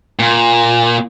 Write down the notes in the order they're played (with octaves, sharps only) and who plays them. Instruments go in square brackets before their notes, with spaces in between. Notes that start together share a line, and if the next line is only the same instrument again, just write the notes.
[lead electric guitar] A#2